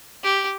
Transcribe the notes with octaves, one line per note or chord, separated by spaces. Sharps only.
G4